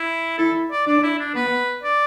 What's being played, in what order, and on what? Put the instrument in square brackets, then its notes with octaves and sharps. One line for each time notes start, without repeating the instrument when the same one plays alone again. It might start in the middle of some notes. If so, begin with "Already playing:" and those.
Already playing: [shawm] E4
[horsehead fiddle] E4 [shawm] A4
[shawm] D5
[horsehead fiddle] D4 [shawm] D5
[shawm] E4
D4
[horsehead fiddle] B3 [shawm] B4
[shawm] D5